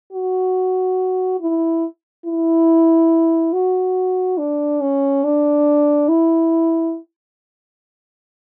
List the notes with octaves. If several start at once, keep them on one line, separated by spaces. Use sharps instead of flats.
F#4
E4
E4
F#4
D4
C#4
D4
E4